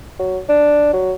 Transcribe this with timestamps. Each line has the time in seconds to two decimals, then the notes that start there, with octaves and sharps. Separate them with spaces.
0.19 F#3
0.49 D4
0.93 F#3